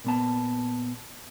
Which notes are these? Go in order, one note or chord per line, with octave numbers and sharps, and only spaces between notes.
A#2 B3 A5